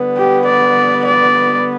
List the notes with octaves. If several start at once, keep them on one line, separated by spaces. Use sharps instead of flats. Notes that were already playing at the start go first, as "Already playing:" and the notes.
Already playing: D3 G3 B3
G4
D5
D5